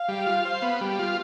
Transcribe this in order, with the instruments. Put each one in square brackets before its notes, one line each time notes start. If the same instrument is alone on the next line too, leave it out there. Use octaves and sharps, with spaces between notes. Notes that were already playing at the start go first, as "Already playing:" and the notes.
Already playing: [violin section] F5
[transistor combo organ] G3
F4
C5
B3
G3
F4